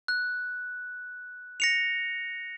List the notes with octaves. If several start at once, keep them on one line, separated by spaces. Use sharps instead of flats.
F#6
A#6 C#7 F7